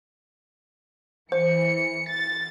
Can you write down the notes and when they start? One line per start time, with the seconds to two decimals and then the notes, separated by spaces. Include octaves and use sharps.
1.32 E3 C5 C#7
2.10 A6